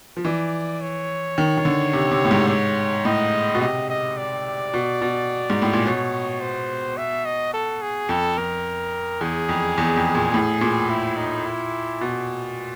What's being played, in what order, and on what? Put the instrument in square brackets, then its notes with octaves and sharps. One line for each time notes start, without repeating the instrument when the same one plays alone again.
[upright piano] F3
[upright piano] E3 [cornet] D5
[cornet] C#5
[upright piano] D#3
D#3
D3
C3
C3
A2
G#2
[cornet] C#5
[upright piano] A2 [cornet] D#5
[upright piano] B2
[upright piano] C3 [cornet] D#5
[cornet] D#5
D5
[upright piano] B2
B2
G#2
A2
A#2
[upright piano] B2 [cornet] C#5
[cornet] C5
E5
D#5
A4
G#4
[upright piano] F2 [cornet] A4
[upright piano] F2 [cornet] A#4
[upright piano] E2 [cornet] G#4
[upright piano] F2
E2
F2
A#2
A2
A#2
[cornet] E4
D#4
E4
[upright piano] B2